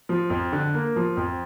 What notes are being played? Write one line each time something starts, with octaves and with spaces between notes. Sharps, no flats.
F3
F2
D3
A#3
F3
F2